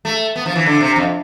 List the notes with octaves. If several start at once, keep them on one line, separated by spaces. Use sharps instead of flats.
A3
B3
F3
E3
D3
C3
F2